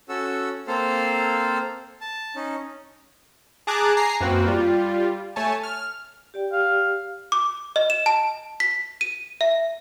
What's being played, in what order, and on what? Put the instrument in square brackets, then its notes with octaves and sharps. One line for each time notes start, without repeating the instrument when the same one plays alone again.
[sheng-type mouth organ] C#4 F#4 A4 E6
A#3 C4 A4 C5 F5
A5
C#4 D#4
[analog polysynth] G#4 A5 A#5 D6 F#6 G#6
G#5 A#5 A#6 C7
F#2 A#3 C4 F#4 B4
G3 F4
A3 C#5 G#5 A5
F6
[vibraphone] G4 D5 G5
[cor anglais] F5
[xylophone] D6
D#5
E7
A5
B6
D#7
E5